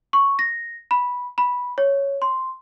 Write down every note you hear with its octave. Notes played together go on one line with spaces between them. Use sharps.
C#6
A#6
B5
B5
C#5
C6